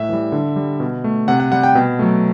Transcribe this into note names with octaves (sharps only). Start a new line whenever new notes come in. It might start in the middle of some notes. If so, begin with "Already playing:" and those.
Already playing: A2 E5
E3 G3
D3
G3
B2
A3
C3 F#5
F#5
G3 F#5
G5
B2
F#3 A3